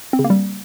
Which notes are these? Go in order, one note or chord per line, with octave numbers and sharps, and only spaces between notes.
C4
C#3
A#3
G3